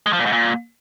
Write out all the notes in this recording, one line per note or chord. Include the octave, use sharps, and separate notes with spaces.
G#3
F3
A#2
G#2
A#2